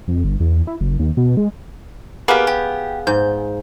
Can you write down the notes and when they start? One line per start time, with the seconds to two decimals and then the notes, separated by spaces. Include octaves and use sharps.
0.08 F2
0.24 G1
0.40 E2
0.67 E4
0.81 F#1
0.99 D#2
1.17 B2
1.37 G#3
2.28 A#3 B3 G4 G#4 F5
2.47 G4
3.07 G#2 G6